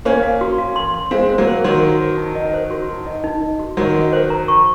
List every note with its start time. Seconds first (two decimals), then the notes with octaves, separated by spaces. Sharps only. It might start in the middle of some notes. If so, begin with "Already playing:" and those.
0.05 A#3 C#4 C5
0.23 F5
0.41 F#4
0.58 F5
0.76 C6
0.94 C6
1.11 G#3 C4 F5
1.29 C5
1.38 F#3 A#3
1.47 C5
1.64 D#3 F#3 C6
1.83 F#4
2.00 C5
2.18 D#4
2.35 D#5
2.54 C5
2.71 F#4
2.89 D#4
3.06 D#5
3.24 D#4
3.42 D#5
3.59 F#4
3.77 D#3 F#3 F#4
3.95 D#5
4.13 C5
4.30 A#5
4.48 C#6